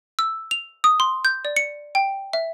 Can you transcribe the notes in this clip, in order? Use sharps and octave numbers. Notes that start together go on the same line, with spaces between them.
E6
F7
D#6
C6
G6
D5
C#7
G5
E5